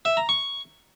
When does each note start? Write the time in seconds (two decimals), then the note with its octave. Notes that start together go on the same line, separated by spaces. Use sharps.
0.05 E5
0.17 A#5
0.29 C#6